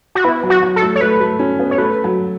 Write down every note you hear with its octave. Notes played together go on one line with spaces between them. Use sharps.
F#4
B3 E4
F#3
F#4
F#3
A4
A3
C#5
A3 B4
A3
C#4
B3
C#5
A3 B4
F#3